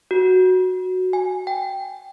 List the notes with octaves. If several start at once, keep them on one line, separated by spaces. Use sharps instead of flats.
F#4
G#5
G5